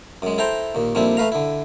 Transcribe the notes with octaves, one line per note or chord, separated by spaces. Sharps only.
F#2 G#3
E4 A4 C5 G5 A#5
D#2 A#2
F2 A#2 G3 C4 D4 E4
A3 B4 F5 A#5
D3 E4